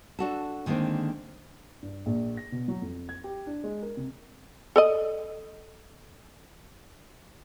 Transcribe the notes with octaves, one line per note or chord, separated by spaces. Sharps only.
D4 F#4 A4
D3 D#3 G#3 A#3 C4
G2
A#1
A#6
B2
F#3
F2
G#6
G4
D4
G#3
A#4
C3
A4 D5 D#5